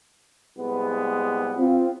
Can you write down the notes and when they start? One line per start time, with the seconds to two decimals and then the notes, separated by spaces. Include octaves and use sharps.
0.57 C2 G#3 B3
1.57 C4 F4